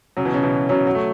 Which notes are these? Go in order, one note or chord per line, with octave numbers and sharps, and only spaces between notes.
C#3 F#3
B2 E3
C#3
B2 E3
C#3 F#3
F#3
A3